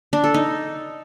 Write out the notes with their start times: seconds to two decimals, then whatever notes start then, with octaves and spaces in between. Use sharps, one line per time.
0.13 D4
0.24 A4
0.34 D#4